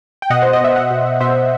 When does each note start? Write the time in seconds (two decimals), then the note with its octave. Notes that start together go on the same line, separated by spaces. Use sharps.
0.22 G5
0.30 B2 D#5 F#5
0.42 C5
0.53 D#5
0.61 B2 E5
0.75 D#5 F#5
0.91 B2
1.20 B2 C5 E5